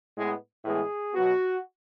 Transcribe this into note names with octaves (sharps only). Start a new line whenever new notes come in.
A2 G#3 B3
A2 E3 G#3 B3 G#4
B2 F#3 B3 F#4